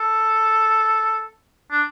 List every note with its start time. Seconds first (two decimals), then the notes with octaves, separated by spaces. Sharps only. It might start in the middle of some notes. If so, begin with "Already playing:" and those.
Already playing: A4
1.71 D4